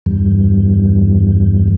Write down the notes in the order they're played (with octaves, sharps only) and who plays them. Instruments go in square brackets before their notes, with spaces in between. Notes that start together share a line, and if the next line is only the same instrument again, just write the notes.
[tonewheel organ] E2 G2